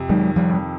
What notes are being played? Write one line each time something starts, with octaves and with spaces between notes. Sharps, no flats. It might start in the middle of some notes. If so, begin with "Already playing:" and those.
Already playing: F2 C3
D#3 F#3 G#3
F3 G3
F2